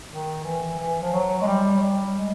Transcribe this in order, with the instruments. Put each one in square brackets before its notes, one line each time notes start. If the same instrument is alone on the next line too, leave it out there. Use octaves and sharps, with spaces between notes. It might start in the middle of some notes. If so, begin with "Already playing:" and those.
[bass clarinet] D#3
E3
E3
F3
F#3
G#3
G3
F#3
G3
G#3